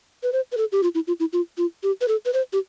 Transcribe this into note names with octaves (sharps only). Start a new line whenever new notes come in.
B4
C5
B4
A4
G4
F4
E4
F4
E4
F4
F4
G4
B4
A4
B4
C5
G4